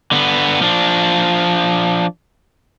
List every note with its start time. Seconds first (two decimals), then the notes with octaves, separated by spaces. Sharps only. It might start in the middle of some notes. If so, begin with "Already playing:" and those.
0.11 D3 B3
0.62 F3 D4